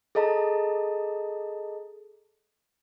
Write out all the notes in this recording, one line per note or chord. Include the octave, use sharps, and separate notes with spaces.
G#4 A4 D#5 A5 A#5